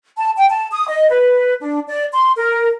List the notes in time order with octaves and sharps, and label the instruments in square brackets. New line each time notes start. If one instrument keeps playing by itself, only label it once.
[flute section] A5
G5
A5
D#6
D#5
B4
D4
D5
C6
A#4